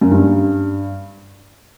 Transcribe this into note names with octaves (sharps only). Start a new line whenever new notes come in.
F#2
G2